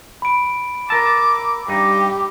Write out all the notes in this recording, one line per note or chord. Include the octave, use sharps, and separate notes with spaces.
B5 D7
A#4 A5 D6 E6
G2 D#4 G4